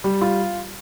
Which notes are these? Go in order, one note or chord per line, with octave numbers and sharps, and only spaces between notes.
G3
F4